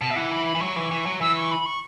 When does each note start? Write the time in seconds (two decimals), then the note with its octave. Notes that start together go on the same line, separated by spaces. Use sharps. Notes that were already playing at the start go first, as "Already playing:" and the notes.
0.01 B2 A5
0.10 E5
0.16 E3 F#5
0.31 B5
0.46 B5
0.55 E3
0.61 F#3 C#6
0.76 E3
0.91 E3
1.06 F#3
1.21 E3 E6
1.36 C#6
1.52 B5
1.66 C#6